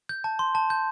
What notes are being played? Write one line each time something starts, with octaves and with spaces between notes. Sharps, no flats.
G6
A5
C6
A5
G6